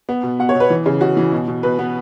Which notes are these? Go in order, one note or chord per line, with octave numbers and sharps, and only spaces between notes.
B3
B2
B2 F#5
C#5
B2
B4
E3
C#3
C#3 F#4
E3
B2
B2
B2 B4
B3